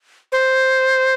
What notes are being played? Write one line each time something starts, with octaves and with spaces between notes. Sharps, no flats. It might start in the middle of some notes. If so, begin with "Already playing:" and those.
C5